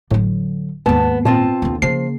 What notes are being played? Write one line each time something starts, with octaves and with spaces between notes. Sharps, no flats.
G1 A2 D3 F#3
D#2 G#2 B3 A5
A#2 C4 F4 A5
D#2 D3
C#3 F3 A#3 C7